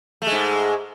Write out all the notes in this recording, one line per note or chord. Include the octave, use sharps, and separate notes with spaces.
G#2 G#3 A3